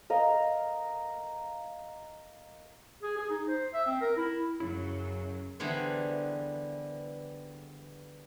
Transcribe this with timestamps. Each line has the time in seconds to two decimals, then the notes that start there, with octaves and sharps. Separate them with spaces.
0.10 A#4 D#5 F5
3.03 G#4
3.17 G#4
3.30 D#4
3.48 C5
3.73 E5
3.86 C4
4.01 A#4
4.16 E4
4.60 F#2 C#3 F#3 E4
5.60 D3 E3 G3 B3 G#4 C5